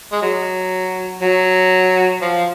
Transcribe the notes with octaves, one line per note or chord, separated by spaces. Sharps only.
G#3
F#3
F#3
F3